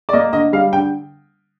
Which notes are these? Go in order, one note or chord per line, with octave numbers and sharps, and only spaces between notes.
D5
A#3 D#5
D3 D#5
G3 F5
D3 G5